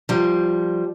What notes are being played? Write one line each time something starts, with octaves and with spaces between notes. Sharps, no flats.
F3 G3